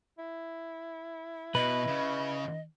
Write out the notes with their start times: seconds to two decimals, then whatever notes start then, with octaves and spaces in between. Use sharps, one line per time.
0.19 E4
1.55 B2 B4 D#5
1.88 C#3